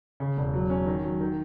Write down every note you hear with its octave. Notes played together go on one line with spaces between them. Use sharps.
C#3
E1
F#3
C#4
D#3
F#3
D#3